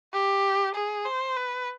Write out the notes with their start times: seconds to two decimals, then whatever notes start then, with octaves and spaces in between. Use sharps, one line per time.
0.13 G4
0.75 G#4
1.06 C5
1.37 B4